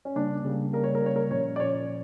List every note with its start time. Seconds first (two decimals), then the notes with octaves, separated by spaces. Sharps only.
0.05 C#4
0.16 C#3 G3 A#3 D4
0.45 C#3 G3 A#3
0.73 C#3 G3 A#3 A#4
0.84 C#5
0.95 A#4
1.02 C#3 G3 A#3 C#5
1.16 A#4
1.31 A#2 F3 C#4 C#5
1.56 D5
1.60 A#2 F3 C#4 C#5